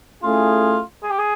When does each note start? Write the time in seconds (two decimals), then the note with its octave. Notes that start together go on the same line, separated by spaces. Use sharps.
0.23 A3 C#4 E4 F4 G#4
1.03 G#4
1.10 G4
1.19 G#4